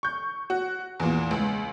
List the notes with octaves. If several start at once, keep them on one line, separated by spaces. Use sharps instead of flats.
C#6 G6
F#4
E2 A#2
C#2